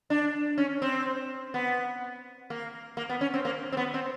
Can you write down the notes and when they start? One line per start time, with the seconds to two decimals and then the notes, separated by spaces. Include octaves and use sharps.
0.10 D4
0.58 C#4
0.82 C4
1.54 B3
2.50 A#3
2.97 A#3
3.09 B3
3.21 C#4
3.34 C4
3.45 A#3
3.72 C4
3.77 B3
3.94 C4